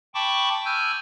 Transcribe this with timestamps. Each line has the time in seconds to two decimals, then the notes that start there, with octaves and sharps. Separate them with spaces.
0.15 G5 A5 B5 C#6 D6
0.65 G#5 E6 F6 G6